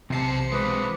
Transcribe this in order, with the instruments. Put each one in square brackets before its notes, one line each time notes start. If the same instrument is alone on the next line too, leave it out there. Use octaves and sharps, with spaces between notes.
[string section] B1 C5 C#7 [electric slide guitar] E2 E4 A5 [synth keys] C3 C7
[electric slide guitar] E3 G#3 [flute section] B4 D6 D#6